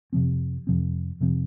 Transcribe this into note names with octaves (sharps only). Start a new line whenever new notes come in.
F2 C3 F3 C4
F2 C3 F3 C4
F2 C3 F3 C4